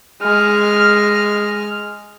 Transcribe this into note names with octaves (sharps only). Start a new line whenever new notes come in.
G#3 F6